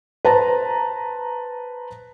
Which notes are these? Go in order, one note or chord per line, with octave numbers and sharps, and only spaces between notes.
B4 C5 A5 A#5